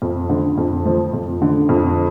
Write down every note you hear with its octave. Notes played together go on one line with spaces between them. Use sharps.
F2
D3
F2
F3
F2
D3
F2